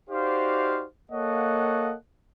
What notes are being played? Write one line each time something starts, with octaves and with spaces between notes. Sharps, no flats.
D#4 F#4 G4 C5 D5 F5
A#3 A4 C#5 D#5 F5 F#5